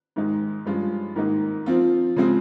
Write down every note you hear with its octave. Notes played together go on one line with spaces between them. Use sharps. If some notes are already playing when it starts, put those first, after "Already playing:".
G#2 D#3 G#3 D#4
G2 F3 G#3 C#4 F4
G#2 D#3 A#3 D#4
F3 C4 F4
C#3 F3 G#3 C4